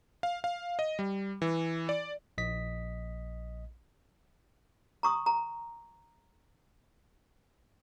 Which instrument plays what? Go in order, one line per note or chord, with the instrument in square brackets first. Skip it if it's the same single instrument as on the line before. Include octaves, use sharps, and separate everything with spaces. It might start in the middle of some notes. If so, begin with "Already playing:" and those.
[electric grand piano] F5
F5
D#5
G3
E3
D5
[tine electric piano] A#1 D#5 B6
[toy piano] A#5 C#6 D#6
A#5